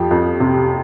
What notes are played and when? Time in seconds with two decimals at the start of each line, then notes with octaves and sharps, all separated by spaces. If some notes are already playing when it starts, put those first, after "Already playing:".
Already playing: F2 F3 G4
0.11 F2
0.40 C3